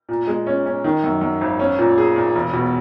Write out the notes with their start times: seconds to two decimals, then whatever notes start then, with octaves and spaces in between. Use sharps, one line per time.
0.09 A#2
0.27 G#3
0.47 C#4
0.66 C#4
0.84 D#3
1.04 F#2
1.21 F#2
1.41 G#1
1.59 C#4
1.78 A#2
1.98 G#4
2.16 A#2
2.35 E1
2.53 B2